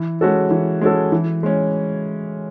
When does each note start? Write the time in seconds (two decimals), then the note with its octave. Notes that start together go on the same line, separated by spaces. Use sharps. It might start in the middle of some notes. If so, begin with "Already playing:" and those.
Already playing: E3
0.21 G#3 C#4 F#4 A4
0.51 E3
0.81 G#3 C#4 F#4 A4
1.12 E3
1.43 G#3 C#4